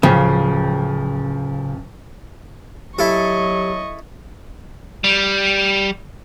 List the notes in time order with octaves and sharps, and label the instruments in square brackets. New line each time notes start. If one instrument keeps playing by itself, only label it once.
[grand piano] D1 F3 G5 [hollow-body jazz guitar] C#3
[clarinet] F#3 [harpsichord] E4 A4 [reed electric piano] G4 [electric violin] D#5 C#6
[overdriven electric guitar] G3